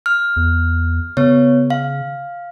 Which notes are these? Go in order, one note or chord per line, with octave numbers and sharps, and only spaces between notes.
F6
E2
C#3 B3 C#5
F5